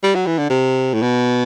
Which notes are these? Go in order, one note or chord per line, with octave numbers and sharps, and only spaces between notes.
G3
F#3
E3
D3
C3
A2
B2